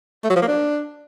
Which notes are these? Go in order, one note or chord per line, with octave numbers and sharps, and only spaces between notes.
A3
F#3
F3
A#3
D4